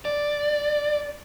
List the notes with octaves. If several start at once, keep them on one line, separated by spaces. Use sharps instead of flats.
D5